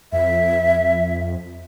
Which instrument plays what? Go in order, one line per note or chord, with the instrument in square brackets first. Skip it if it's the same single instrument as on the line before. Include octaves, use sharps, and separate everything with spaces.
[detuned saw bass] F2 [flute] E5